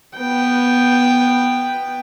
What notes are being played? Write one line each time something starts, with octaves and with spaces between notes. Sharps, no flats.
B3 G5